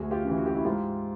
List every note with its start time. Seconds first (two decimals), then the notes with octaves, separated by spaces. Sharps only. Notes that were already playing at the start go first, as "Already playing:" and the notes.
Already playing: D2 F#4 G#4
0.11 F4 G4
0.24 C#3 E3
0.38 F#4
0.46 G4
0.54 E4 F#4
0.65 G#2 F4 G4